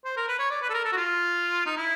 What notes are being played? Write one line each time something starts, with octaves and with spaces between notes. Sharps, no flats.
C5
A#4
B4
C#5
D5
B4
A4
A#4
A4
F#4
F4
D#4
E4